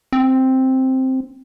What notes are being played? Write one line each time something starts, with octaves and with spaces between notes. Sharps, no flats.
C4